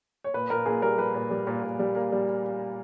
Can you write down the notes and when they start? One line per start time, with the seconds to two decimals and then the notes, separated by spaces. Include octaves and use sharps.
0.24 C#5
0.34 A#2 B4
0.50 A#2 A#4
0.66 A#2 G#4
0.82 G3 A#4
0.98 G3 B4
1.14 A#2
1.31 G3
1.47 A#2
1.63 A#2
1.79 G3
1.95 A#3
2.12 G3